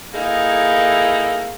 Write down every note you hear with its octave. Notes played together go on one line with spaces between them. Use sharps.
A#3 D#4 E4 G#4 A4